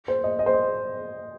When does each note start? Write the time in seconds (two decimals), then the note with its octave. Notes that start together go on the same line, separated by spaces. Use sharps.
0.08 C5
0.24 D#5
0.39 D#5
0.46 C5
0.53 D#5